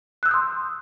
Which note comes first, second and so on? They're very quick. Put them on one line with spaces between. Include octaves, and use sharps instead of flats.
F#6 E6 G6 D#6 C6